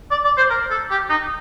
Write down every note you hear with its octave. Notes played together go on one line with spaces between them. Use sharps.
D5
D5
C5
A#4
A4
G4
D#4